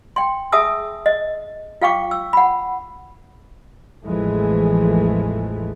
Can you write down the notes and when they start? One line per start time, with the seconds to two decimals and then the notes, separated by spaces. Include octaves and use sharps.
0.16 G5 C6
0.52 G#4 E5 G#5 A5 D#6 E6
1.06 D#5
1.81 F4 F5 G5 C#6 D6
2.11 E6
2.33 F#5 B5
4.05 A1 E2 E3 F3 G#3 A3